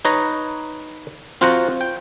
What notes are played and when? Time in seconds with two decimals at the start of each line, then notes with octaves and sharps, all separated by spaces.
0.05 D#4 B4 C#5 A#5
1.41 C4 F4 F#4 C5 F#5 A#5
1.81 G5